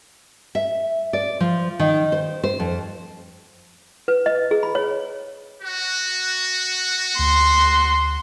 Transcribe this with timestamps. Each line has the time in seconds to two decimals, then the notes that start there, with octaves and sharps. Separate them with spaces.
0.55 E5
1.13 D5
1.40 F3
1.79 D#3
2.12 C5
2.44 C5
2.60 F2
4.08 B4
4.26 D#5
4.51 G#4
4.63 B5
4.75 C#5
5.61 F#4
7.19 D2 C6